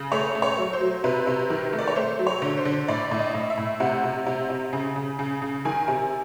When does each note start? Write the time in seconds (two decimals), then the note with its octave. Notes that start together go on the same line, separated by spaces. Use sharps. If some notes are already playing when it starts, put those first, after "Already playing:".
Already playing: C#3
0.12 A3 C#5
0.35 A3
0.42 C#5
0.58 F#3
0.73 C5
0.81 F#3
1.04 C3 B4
1.27 C3
1.50 D#3
1.73 A3
1.79 D5
1.88 C#5
1.96 A3 C5
2.19 F#3
2.27 C#5
2.42 D3
2.58 C5
2.65 D3
2.88 A2 D5
3.11 A2
3.19 D#5
3.34 A2
3.50 E5
3.58 A2
3.80 C3 F#5
4.04 C3
4.26 C3
4.50 C3
4.73 C#3
4.96 C#3
5.19 C#3
5.42 C#3
5.65 D#3 G#5
5.88 C3